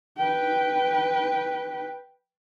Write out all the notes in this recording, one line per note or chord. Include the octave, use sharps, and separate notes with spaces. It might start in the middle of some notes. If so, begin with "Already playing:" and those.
B4 G5